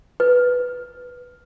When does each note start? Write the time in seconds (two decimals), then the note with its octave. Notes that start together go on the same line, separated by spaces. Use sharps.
0.20 B4